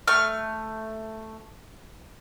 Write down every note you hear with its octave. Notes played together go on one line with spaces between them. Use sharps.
A3 F6